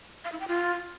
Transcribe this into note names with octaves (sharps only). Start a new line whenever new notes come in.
F5
E4
G5
F4